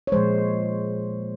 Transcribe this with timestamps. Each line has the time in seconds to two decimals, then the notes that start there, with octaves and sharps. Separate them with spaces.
0.07 C#5
0.12 A#2 F3 G#3 C5